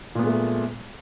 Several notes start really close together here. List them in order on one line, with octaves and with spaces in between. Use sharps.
A#2 B3 G#3 A3